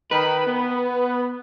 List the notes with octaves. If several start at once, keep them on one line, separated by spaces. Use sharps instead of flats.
D#3 B4 B5
B3